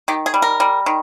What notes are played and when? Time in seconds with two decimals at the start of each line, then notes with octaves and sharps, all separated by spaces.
0.08 D#3 G4
0.26 G#4
0.34 G3
0.42 A#4
0.60 G3
0.86 D#3